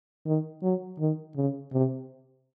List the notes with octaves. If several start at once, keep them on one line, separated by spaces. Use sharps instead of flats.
D#3
F#3
D#3
C#3
C3